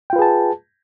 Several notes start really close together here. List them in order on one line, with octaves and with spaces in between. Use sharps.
G5 F4 B4 G#4 A5